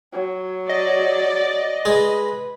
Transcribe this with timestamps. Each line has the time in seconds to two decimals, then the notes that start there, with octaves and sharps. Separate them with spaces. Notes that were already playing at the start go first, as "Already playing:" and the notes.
0.13 F#3
0.69 D5 D#5
1.85 G#3 B4